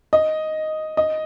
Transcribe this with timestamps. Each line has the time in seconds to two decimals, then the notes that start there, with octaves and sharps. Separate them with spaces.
0.13 D#5
0.97 D#5